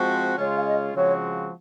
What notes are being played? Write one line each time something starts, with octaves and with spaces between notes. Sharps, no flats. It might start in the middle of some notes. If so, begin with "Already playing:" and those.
Already playing: F3 G#3 C4 F#4
C#3 G#3 C#4 F4 C#5
F5
D#5
C#3 F3 G#3 C4 F#4 C#5